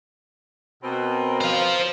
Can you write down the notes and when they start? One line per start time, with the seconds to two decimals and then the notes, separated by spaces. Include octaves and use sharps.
0.83 B2 C4 A#4
1.41 C5 F5